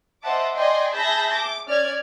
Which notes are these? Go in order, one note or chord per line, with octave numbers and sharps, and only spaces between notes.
C5 D#5 E5 F#5 A5 D6
D5 D#5 G5 G#5 C6
G#4 E5 A5 B5 G6 A#6
D6
C#4 D5 F6 G#6